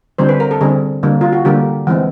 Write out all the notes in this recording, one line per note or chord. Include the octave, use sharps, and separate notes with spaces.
D3 G3 C4 C5
B4
A#4
A4
D3 G3 C4 G#4
D3 G3 A#3
F4
F#4
D3 G3 A#3 G4
E3 G#3 C4